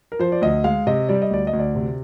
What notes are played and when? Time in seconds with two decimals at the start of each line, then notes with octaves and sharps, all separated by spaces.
0.12 A#4
0.19 F3 C5
0.32 D5
0.42 D2 D#5
0.64 G#3 F5
0.87 C3 D#5
1.09 G3 D5
1.22 D#5
1.30 D2 D5
1.47 D#5
1.53 D2
1.59 D5
1.75 C3